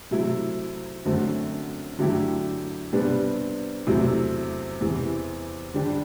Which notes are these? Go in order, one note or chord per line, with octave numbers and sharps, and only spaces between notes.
C3 F#3 A3 E4
F#2 D3 A3 C4 F#4
D3 F#3 A3 E4 G4
C3 G3 B3 D4
E2 C3 F#3 A3 E4
E2 C3 E3
D3 G3 D4 G4